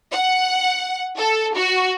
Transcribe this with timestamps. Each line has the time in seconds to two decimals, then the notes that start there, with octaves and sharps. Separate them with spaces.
0.13 F#5
1.18 A4
1.55 F#4